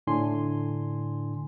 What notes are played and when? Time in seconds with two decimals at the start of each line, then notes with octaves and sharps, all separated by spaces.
0.07 A2 D3 D4 G#5 C6